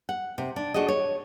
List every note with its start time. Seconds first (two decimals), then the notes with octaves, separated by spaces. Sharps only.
0.09 F#5
0.38 C3
0.56 D4
0.74 A3 D4 F#4 G#4 D#5
0.88 C#5